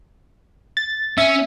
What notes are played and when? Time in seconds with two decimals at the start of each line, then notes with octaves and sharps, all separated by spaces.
0.77 A6
1.18 C#4 E5